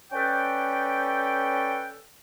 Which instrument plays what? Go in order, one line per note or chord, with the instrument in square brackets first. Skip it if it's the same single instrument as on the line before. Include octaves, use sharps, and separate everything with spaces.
[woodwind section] C#4 A4 B4 D5 G5